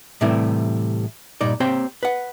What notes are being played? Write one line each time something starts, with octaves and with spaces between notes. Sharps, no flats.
A2 C3 E3 G3 A3 E4
G2 A#2 D#4 D5
A#3 C4 G4 C5 C#5 G5
B4 F#5